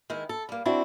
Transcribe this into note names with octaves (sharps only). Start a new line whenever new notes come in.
D#3 G#3 E4
A4
G3 A#3
C4 D4 E4 F#4